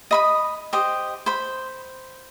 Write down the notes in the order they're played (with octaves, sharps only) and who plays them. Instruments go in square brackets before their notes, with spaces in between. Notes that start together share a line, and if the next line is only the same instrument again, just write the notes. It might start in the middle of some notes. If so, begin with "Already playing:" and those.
[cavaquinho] D#5 B5 D#6
G4 C5 D#5
C5 B5